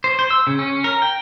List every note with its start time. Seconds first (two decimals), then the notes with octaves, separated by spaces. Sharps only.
0.04 C5
0.19 C5
0.31 E6
0.47 C#3
0.59 C#4
0.84 A#4
1.02 G5